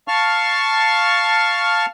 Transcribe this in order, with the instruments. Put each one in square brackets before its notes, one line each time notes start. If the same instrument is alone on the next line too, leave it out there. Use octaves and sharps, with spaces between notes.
[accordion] F5 A5 C#6 F6